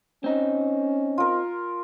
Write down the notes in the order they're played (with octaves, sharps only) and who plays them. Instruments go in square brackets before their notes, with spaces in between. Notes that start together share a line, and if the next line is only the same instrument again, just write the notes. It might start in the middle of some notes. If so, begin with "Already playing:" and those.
[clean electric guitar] C4 D#4 [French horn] C#4
[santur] F4 A#4